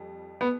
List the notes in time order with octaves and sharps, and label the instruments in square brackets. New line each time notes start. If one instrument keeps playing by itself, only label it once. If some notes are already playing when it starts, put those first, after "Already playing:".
Already playing: [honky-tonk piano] F2 G3
[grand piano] B3